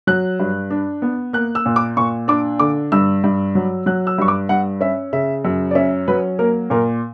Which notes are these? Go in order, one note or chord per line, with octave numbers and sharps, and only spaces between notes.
F#3 F#6
G2
D4
B3
A#3 F#6
E6
A#2
D6
A#2 C#6
D4 D6
D3 D6
G2 E6
G2
F#3
F#3 F#6
E6
G2 C#6
D6
G2 F#5
C#4 E5
C#3 E5
F#2
D5
C#4 E5
F#3 B4
A#3 A#4
A#2 A#4